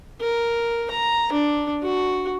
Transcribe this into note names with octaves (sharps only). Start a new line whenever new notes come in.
A#4
A#5
D4
F#4